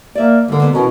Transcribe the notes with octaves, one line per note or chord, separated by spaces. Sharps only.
A#3 D5 E5
G#2 D3 A#3
B2 A#3 B3
B2 E3 C#4 A#4